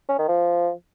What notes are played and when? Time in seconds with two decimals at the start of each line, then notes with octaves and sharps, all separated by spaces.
0.09 C#4
0.18 D#3
0.28 F3